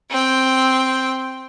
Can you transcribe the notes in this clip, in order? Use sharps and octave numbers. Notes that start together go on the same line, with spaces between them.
C4 G5